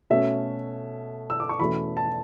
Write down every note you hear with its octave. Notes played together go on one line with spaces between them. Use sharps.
B2 A3 C#4 E5
E6
D6
C#6
E2 B2 A3 C#4 B5
A5